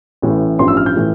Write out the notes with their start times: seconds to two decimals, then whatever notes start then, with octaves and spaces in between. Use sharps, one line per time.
0.22 A1 A2 E3
0.59 A1 G2 F3 C6
0.68 E6
0.77 F6
0.86 G6
0.96 A2 E3